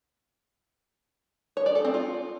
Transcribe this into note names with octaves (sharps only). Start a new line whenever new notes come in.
C#5
D5
A4
C4
F4